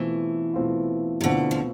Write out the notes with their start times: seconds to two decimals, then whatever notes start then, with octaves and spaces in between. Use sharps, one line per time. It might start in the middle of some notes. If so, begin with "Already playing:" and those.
Already playing: B2 E3 A3 C4 F4
0.54 B2 A3 C4 F4
1.21 C3
1.24 B2 D3 A3 C4 F4
1.51 F3